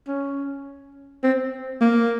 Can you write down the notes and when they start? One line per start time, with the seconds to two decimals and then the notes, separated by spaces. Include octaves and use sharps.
0.08 C#4
1.24 C4
1.81 A#3